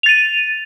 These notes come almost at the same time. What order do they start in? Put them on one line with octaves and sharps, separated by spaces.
F7 A6 D#7